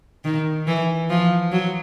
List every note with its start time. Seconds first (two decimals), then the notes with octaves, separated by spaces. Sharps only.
0.25 D#3
0.67 E3
1.10 F3
1.52 F#3